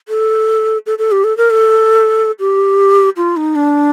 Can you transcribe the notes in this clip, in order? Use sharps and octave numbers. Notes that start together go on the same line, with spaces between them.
A4
A4
A4
G4
A4
A#4
A4
G4
F4
D#4
D4